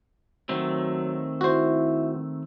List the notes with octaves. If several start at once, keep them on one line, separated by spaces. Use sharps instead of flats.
D#3 F#3 A3 C4
E4 F#4 C5